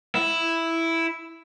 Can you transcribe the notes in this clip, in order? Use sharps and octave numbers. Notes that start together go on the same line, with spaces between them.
E4